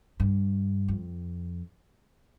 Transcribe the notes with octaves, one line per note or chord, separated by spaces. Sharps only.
G2
F2